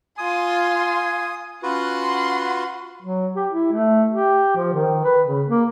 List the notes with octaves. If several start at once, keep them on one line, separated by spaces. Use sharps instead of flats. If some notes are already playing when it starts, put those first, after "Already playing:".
F4 G#5 C6 D#6
C#4 F4 F#4 B4 F#5 C6
F#3
G4
E4
A3
G4
F3
D#3
B4
C#3
A#3